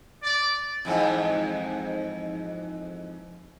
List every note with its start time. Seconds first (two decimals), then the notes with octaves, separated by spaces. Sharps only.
0.24 D5
0.85 F2 G#2 E3